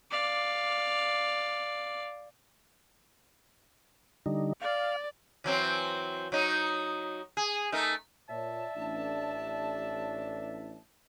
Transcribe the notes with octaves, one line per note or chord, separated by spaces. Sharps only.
D5 F5
D3 G3 D#4
D5 F5
E3 F#3 C4
F#3 D#4
G#4
A3 D#4 A#4
A#2 C#5 D5 E5 A5
A1 D4